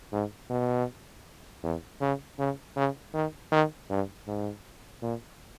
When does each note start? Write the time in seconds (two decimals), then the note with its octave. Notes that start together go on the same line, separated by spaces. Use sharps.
0.12 G#2
0.50 B2
1.63 E2
2.01 C#3
2.39 C#3
2.76 C#3
3.14 D#3
3.52 D#3
3.90 G2
4.28 G#2
5.02 A#2